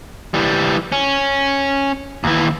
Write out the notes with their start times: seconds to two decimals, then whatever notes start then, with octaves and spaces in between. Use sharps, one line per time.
0.34 E3 G3
0.92 C#4
2.24 D#2 E3